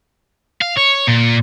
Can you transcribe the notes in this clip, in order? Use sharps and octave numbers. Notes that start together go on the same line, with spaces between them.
F5
C#5
A#2